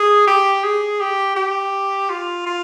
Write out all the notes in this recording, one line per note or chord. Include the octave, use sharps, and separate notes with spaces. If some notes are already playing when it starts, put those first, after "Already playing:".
Already playing: G#4
G4
G#4
G4
G4
F4
F4